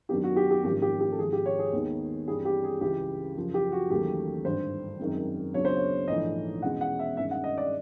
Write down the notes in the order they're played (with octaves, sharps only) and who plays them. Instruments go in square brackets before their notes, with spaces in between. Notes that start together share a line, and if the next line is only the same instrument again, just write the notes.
[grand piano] F#2 D#3 F#3 B3 D4 G4
F#4
G4
G4
G#1 G#2 F3 A#3 C#4 G4
G4
G4
A4
G#1 G#2 F3 G#3 G#4
G4
C#5
G#4
D#2 D#3 G#3 B3
G2 E3 G3 C4 G#4
G4
G#4
C#2 C#3 E3 G4
F#2 C#3 F3
G4
F#4
E1 D#2 C#3 F#3 A3 G4
G#1 G2 D3 C5
F#2 D#3 G#3 C4
C#2 C#3 F#3 B3 D4 C#5
C5
C#5
A#1 G#2 E3 A3 D4 D#5
E2 B2 G#3 C#4 F#5
F#5
E5
G2 D#3 G#3 C#4 E5
F#5
D#5
D5